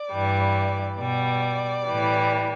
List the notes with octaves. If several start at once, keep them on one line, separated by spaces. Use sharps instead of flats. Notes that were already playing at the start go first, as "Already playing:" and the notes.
Already playing: D5
G2 E3 G3
B2 G3 D5
A2 E3 G3